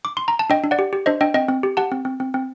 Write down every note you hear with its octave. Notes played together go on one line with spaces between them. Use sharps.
D6
C6
A#5
A5
D4 D#5 G5
D4
D5 F#5
G4
G4
D4 C5 D#5
D4 D#5 G5
C4 D#5 G5
C4
G4
G4 F#5 A5
C4
C4
C4
C4